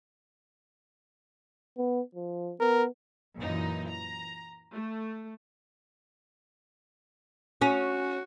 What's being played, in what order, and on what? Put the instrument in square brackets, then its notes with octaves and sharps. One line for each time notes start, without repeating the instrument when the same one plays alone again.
[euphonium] B3
F3
[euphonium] B3 [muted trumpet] A#4
[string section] F#2 A#2 E3 D#4
A#5
A3
[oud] C#4 [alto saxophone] F#4